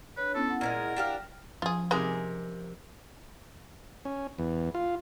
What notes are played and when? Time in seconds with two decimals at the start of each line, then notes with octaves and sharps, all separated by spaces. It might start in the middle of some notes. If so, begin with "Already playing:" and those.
0.17 D4 B4 C#5
0.34 B3 C#4 E4 A4
0.49 E4 F#5
0.61 A#2 E3 G#3 A#4
0.96 D4 G4 F5
1.62 F3 C#4 F4 G#4
1.91 C3 G#3 D#4 A#4 G#5
4.05 C#4
4.39 E2
4.75 F4